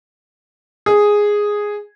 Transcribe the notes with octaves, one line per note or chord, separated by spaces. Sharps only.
G#4